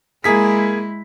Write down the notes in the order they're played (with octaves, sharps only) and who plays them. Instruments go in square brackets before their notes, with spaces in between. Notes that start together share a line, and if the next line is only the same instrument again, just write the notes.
[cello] G#3 E4 [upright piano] A#3 G#4 B6